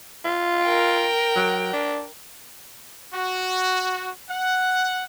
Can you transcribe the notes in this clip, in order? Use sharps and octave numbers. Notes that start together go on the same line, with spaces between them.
F4
A#4 G5
F#3
D4
F#4
F#5